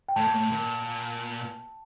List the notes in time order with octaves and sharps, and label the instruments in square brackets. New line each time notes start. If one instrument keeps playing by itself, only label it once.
[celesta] G5
[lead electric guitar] A2 [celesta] A5
[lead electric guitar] A#2
A2
A#2